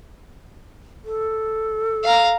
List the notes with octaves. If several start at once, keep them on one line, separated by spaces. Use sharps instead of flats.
A4
F5 A#5